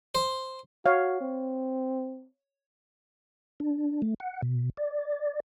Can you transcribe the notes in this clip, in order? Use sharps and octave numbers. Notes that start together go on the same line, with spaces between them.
C5
F#4 C#5 F5
C4
D4
A3
F#5
B2
D5